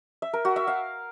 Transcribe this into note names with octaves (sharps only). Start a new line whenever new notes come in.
E5
A#4
F#4
E5
F5